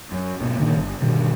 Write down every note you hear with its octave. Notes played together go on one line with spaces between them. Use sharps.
F#2
G#2 B2
A#2 D3 D#3
G1
G2 B2 D3 D#3